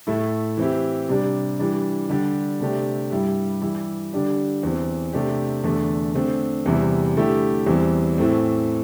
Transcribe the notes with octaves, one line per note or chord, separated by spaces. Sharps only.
A2 A3 E4
E3 C4 E4 G4
C3 G3 D4
E3 G3 D4
D3 G3 D4 G4
C3 A3 D4 G4
G2 G3 E4 G4
E3 G3 E4 G4
D3 G3 D4 G4
E2 E3 C4
C3 A3 D4 G4
E2 D3 A3
D3 A3 C4
E2 C3 G3 E4
D3 A3 E4 G4
E2 E3 G3 C4
A2 E3 A3 C4